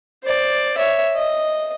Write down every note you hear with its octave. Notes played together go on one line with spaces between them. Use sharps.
C5 D5
C#5 E5
D#5